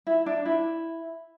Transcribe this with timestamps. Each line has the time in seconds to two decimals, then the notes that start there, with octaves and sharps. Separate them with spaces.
0.07 E4
0.26 D4
0.45 E4